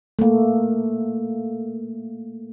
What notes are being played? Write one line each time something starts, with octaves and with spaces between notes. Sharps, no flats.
A3 A#3